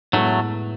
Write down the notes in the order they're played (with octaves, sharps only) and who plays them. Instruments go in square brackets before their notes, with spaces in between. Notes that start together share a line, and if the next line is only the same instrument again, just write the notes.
[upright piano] A2 G#3 B3 E4 B4 [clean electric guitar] F#3 A3